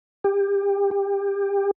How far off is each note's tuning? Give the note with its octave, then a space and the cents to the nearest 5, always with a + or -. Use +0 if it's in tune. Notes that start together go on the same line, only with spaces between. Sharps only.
G4 +30
G4 +25